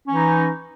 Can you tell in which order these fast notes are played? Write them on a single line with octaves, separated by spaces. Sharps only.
C#4 E3 D#4